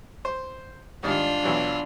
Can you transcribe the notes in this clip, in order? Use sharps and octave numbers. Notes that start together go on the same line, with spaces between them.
C5
G#2 D#3 G3 D4 F4
B1 E3 F#3